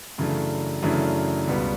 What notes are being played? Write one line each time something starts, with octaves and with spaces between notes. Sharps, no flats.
F#2 C#3 E3 A3 D4
F#2 C#3 E3 A3 D4
C#2 B2 G3 B3